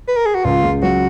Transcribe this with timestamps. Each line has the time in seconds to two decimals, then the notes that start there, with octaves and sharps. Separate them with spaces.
0.08 B4
0.16 A#4
0.26 G#4
0.35 F#4
0.44 C#2 F4
0.63 C#3
0.82 F#3 F#4